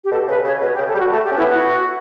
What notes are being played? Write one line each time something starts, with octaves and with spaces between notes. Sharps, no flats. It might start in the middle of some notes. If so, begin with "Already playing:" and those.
G4
B2 A4
C#3 B4
C#3 C#5
B2 B4
G4
C#3
A4
G3 G4
F#4
A3 A4
G4
C#4
B3 E4
F#4